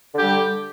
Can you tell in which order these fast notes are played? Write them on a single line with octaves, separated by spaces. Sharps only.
D3 G4 G3